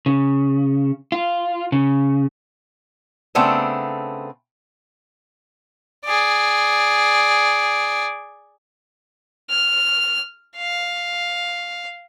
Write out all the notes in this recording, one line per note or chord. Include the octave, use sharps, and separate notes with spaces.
C#3
F4
C#3
C#3 A3 B3 C4 D4 A4
G#4 D5
F6
F5